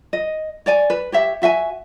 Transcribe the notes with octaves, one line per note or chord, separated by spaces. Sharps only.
D#5
C#5 D5 G#5
B4
G4 C#5 E5
F#4 E5 G5 G#5